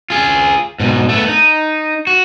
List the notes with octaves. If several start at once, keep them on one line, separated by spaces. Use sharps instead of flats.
F4 G#4
G#2 B2
A3 B3
D#4
F#4